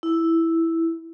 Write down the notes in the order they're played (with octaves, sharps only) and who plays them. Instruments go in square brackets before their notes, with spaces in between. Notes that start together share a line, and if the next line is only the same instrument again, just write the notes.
[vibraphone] E4